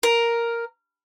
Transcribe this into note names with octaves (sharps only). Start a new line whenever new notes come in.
A#4